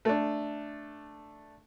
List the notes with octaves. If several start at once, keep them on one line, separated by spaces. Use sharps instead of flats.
A3 D4